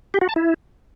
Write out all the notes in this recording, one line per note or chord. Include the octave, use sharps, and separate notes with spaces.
G4
F#4
A5
E4